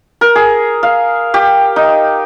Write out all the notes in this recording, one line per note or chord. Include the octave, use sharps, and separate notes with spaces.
A#4
G#4
F5
G4
D#4